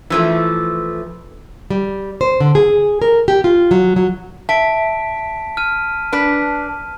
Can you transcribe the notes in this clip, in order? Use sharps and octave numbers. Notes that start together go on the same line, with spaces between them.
E3 F3 A3
G3
C5
D3
G#4
A#4
G4
F4
F#3
F#3
E5 A5 B6 D7
F6 D#7
D4 B4